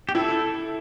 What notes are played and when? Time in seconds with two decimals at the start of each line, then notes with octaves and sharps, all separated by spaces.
0.09 G4
0.15 E4 A4